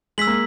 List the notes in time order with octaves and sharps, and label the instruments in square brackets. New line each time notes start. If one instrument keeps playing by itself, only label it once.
[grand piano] G#3 [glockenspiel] E6 B6 F#7
[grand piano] A#3